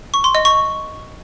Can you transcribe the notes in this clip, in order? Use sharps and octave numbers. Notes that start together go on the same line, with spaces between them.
C#6
C6
D#5
C#6